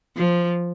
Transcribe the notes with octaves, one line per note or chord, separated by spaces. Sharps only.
F3